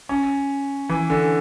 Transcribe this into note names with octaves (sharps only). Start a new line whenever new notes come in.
C#4
E3
D3